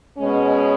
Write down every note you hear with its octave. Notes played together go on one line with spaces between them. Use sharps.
B2 G#3 C#4